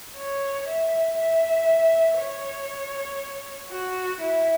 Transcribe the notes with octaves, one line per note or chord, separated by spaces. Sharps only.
C#5
E5
E5
C#5
F#4
E4